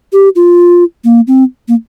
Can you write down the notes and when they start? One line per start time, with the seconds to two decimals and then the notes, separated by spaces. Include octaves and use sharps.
0.13 G4
0.36 F4
1.04 A#3
1.28 C4
1.68 A#3